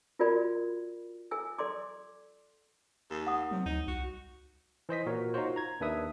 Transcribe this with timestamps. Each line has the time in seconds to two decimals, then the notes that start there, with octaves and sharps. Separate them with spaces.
0.19 F4 F#4 A#4 D5 B5
1.31 A4 G#5 E6
1.58 A4 D5 C6 D6
3.10 D#2
3.27 F#5 D#6
3.51 C3 F#3
3.66 D2 D#4
3.88 C2 F#4
4.89 E3 C5 D#5 B6
5.06 A#2 F#4 A#4 C#5
5.34 D#4 F4 F#4 C5
5.56 A#5 G#6
5.80 D#2 D#3 D4 B4 E5 D#6